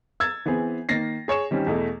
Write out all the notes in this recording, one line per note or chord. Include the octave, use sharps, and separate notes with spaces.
E6 G#6 A6
E3 B3 C4 G#4
D#3 A#3 A6 A#6 C7
G#4 C#5 C#6 E7
D#3 G3 C4 C#4
E2 B2 A3